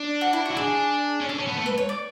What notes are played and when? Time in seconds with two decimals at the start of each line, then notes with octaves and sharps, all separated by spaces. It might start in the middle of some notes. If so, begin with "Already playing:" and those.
Already playing: D4
0.21 F#4
0.33 E4
0.46 F#4
0.51 E4
0.57 D4 G#4
1.21 C#4
1.29 D4 A4
1.38 C#4
1.47 B3
1.56 A3
1.66 B4
1.78 C#5
1.89 D5